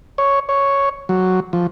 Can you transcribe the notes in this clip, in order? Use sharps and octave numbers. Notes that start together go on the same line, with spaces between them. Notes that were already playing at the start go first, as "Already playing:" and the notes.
C#5
C#5
F#3
F3